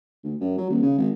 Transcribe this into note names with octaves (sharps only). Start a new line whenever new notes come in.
D2
F#2
F#3
D#1
C#3
G#1